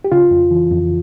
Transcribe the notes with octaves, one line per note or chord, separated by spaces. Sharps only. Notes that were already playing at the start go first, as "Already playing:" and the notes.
G4
C#3 F4
F2
E3
F2